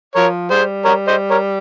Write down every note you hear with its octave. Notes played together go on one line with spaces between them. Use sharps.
F3 A#4 C#5
G3 G#4 C5
A#4 C#5
C5 D#5
A#4 C#5